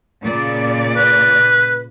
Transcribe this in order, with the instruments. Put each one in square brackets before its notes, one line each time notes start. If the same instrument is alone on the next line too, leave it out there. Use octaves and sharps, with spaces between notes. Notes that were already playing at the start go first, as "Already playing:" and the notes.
[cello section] A#2 C#3 D5
[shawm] B4